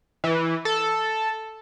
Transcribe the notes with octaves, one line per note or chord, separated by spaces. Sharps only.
E3
A4